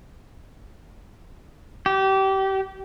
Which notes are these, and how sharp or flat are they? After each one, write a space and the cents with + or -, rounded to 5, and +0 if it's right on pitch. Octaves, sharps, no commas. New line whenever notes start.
G4 -25